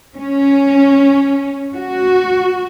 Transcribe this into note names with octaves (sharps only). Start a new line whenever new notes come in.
C#4
F#4